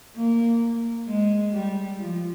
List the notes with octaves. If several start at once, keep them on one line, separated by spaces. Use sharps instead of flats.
A#3
G#3
G3
F3